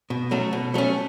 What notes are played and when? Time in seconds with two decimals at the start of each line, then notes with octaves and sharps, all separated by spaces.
0.10 B2
0.31 F#3 A3 C#4
0.53 B2
0.74 F#3 A3 C#4